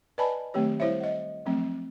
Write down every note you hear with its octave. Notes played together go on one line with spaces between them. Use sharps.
B4 D5 D#5 G#5 A5 B5
D#3 F#3 A3 C4 G4 C#5
G3 E4 C5 C#5 E5
D#5 F#5
F3 F#3 A3 C4